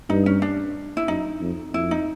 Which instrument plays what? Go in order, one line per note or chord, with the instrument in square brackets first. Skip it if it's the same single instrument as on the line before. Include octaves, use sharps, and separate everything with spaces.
[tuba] G2 [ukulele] D#4
[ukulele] C#4
D4
E4
[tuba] F#2 [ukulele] D#4
[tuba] F2
[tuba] F2 [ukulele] E4
[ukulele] D#4